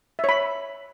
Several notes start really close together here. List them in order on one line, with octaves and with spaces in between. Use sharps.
E5 C#5 B5